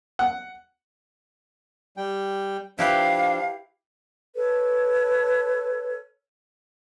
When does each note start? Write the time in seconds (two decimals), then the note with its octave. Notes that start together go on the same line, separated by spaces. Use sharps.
0.19 F#5
1.97 G3 G5
2.79 F3 D4 E4 G4 B4 F5
4.35 A4 B4 C#5